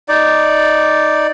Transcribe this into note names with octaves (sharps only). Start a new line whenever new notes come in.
D#4 D5